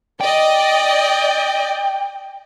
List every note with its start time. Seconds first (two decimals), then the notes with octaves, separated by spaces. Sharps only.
0.21 D5 D#5 G5